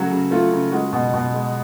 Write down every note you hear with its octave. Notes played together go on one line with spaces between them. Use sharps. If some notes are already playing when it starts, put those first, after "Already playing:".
Already playing: C#3 F#3 A3 F#4
C#3
A3 F4
C#3
G#3 F#4
B2
B2
G#3